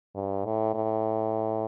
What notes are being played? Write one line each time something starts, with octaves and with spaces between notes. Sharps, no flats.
G2
A2
A2